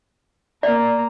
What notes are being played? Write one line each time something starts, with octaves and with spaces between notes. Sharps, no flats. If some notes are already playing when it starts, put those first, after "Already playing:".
A#3 D5 A#5